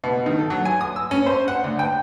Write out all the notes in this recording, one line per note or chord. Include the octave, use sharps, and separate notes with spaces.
B2
D#3
A4
F#3
G#5
D#6
E6
C#4
C5
F#5
D2
G5